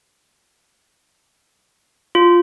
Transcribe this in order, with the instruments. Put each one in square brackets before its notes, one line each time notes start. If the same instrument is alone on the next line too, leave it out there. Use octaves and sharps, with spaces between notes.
[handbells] F4